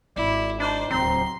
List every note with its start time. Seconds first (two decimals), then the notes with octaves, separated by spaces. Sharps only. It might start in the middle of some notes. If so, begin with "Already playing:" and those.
0.16 G#1 E4 D5
0.60 D4 D#4 C5 D5
0.91 D1 C#2 C4 A#5 C6